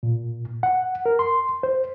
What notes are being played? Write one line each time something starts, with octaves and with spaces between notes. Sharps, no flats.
A#2
F#5
A#4
C6
C5